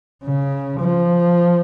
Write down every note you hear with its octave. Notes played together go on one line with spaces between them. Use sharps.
C#3
F3